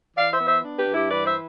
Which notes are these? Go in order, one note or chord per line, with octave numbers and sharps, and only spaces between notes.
E3 D5 F5
C5 E5
B3
C5 E5
D4
G4 B4
G2
E4 G4
E3 B4 D5
C5 E5